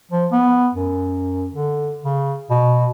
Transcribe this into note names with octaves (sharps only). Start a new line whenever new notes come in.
F3
B3
F#2
D3
C#3
B2